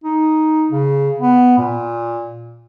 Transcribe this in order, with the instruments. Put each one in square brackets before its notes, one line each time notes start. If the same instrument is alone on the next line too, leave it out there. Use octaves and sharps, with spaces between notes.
[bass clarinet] D#4
C#3
B3
A#2